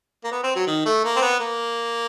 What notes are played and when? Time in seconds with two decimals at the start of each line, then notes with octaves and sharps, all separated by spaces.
0.24 A#3
0.32 B3
0.44 C4
0.55 F#3
0.67 D#3
0.86 A3
1.04 A#3
1.16 C4
1.22 B3
1.40 A#3